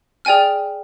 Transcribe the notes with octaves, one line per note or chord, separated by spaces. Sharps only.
G#4 D5 G5 G#5 F6